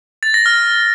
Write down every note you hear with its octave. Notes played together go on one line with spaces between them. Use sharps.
A6
A#6
F6